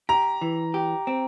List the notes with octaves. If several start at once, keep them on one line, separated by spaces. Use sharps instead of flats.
G4 A#5
E3
G4
C4